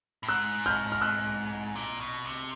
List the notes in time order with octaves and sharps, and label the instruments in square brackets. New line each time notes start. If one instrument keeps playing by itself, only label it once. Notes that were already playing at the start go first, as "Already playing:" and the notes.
[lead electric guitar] A2
[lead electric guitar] G#2 [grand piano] E6 F#6
[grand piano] F6 G6
F6
E6 F#6
[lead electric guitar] A#2
B2
C3